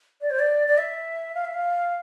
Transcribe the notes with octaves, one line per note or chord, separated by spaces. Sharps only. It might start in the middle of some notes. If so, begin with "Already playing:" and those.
D5
C5
D5
D5
E5
F5
E5
F5